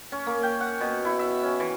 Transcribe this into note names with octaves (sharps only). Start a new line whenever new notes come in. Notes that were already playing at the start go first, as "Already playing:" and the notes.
C#4
A#3
G5
F#5
B2
E4
E5
C#4
E3